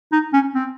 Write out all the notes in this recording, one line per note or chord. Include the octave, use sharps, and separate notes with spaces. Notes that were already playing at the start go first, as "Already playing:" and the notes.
D#4
C#4
C4